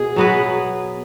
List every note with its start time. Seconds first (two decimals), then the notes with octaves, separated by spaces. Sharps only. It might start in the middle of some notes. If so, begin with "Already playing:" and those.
Already playing: B2 G#4
0.16 F#3 B3 F#4 B4